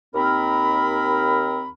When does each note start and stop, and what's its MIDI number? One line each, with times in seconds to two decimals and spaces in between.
0.15 1.69 39
0.15 1.69 60
0.15 1.69 70
0.15 1.69 83